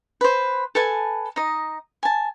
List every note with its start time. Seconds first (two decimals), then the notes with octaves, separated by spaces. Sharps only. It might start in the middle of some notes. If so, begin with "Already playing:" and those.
0.21 B4 C5
0.75 A4 B4 G#5 A5
1.36 D#4 D#5
2.03 G#5 A5